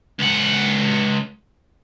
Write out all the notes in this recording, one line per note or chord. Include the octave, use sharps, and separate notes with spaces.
C#2 F#5